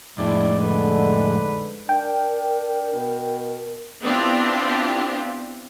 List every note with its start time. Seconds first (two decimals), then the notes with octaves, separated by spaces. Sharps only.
0.18 F2 A2 G#3 D4 E4 D5
0.60 G#2 D3 B4
1.89 D4 A#4 G5
2.94 B2
4.02 B3 C4 D4 E4 F4 G4